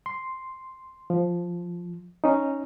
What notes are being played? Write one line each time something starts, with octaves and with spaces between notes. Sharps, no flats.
C6
F3
C#4 D#4